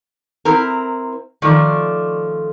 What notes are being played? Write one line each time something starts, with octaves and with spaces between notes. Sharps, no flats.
C4 E4 A#4
D#3 F3 A3 D5